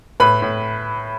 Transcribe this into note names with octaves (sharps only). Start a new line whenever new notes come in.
A2 B4 B5
A2